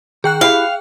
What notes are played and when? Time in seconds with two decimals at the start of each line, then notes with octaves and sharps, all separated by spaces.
0.24 D#3 G#4 G5 F#6
0.41 E4 G4 F5 B5